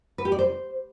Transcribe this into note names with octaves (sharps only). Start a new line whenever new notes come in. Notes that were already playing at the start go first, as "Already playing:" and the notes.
B4
G4
D5
C5